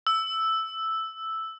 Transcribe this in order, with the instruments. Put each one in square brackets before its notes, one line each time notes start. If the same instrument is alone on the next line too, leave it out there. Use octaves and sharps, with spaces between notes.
[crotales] E6